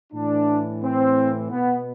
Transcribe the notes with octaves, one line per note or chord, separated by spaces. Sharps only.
A2 E3 D4
C4
B2 B3